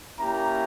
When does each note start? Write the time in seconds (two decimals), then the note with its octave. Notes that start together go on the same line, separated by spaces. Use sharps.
0.18 A#3 C#4 E4 G4 A#5